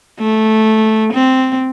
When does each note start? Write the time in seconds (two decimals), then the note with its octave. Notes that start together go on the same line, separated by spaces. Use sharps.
0.19 A3
1.13 C4